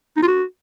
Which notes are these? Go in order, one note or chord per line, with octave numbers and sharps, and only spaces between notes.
D#4
F4
F#4